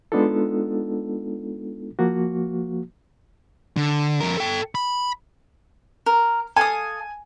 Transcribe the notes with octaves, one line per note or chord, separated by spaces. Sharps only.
G#3 B3 D4 D#4 F4 A4
F3 A#3 F#4
D3
F2 A#4
A4 G5
B5
A#4
A4 F5 G#5 D#6